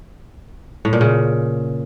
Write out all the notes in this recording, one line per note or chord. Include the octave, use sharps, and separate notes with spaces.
A2
A#2
C#3